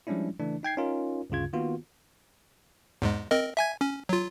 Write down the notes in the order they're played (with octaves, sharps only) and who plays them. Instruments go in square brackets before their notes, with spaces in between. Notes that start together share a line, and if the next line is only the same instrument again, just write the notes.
[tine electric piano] F3 G3 G#3 C#4 D4 E4
C#3 E3 A3 D4
D#4 G5 G#6 C7
C#4 D#4 F4 A#4
D2 G2 C#3 F4 G#6
D#3 A#3 B3 F4 F#4
[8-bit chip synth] E2 G#2 G#3
C4 A#4 D#5
E5 G#5 G#6
C#4
F#3 F4